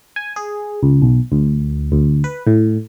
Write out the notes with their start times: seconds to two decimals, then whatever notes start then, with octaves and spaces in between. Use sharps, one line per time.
0.16 G#5
0.36 G#4
0.83 C#2
1.02 B1
1.32 D2
1.92 D2
2.24 B4
2.47 A2